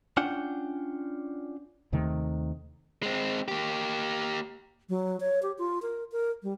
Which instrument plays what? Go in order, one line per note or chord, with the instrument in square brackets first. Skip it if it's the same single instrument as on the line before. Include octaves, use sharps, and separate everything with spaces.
[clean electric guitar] C#4 D4 F4 F#5 G5
[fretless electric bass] D#2 C3 D#3 A3
[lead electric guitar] G#3 C4
A#3 G4
[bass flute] F#3
C#5
G4
F4
A#4
A#4
G3